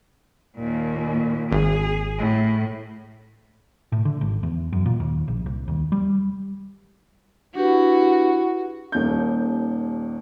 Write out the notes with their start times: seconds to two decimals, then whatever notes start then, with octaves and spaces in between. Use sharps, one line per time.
0.57 D#2 A#2
1.52 G#1 G#4
2.18 A2
3.92 A2
4.05 D3
4.21 G#1
4.43 E2
4.73 F#2
4.86 A#2
5.00 D#2
5.28 A#1
5.46 C2
5.68 D#2
5.92 G3
7.55 D4 E4 F#4 G4 B4
8.92 D#1 D#2 G6